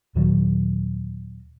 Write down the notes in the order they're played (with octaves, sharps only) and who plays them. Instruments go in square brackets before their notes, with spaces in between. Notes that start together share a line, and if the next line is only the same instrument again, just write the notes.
[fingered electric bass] D#2 A#2 D#3 F#3